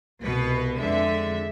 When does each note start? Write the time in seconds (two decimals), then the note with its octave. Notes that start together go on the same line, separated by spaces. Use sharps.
0.22 C2 B2 B3 B4
0.78 F2 D3 G#3 E5